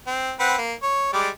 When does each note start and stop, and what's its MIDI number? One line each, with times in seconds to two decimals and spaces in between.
0.07 0.32 60
0.40 0.56 60
0.40 0.56 71
0.40 0.56 78
0.58 0.73 58
0.82 1.08 73
1.13 1.29 55
1.13 1.29 56
1.13 1.29 74